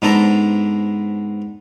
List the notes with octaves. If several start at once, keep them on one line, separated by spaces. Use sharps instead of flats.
G#2 B3 D4 A4 C5 A#5